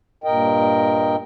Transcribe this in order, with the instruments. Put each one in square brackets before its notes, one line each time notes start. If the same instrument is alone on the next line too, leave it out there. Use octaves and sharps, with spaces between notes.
[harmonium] G2 A#2 A#4 D#5 G5